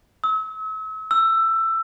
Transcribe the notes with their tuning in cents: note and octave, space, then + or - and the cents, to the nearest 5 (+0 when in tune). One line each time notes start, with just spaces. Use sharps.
E6 -40
E6 +15